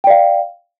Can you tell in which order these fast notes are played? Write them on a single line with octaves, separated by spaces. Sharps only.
G5 D5 F5